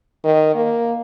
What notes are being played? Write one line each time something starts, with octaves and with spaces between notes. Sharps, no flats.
D#3
A#3